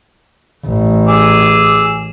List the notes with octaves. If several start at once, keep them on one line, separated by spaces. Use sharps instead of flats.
A1
G#4 D6 E6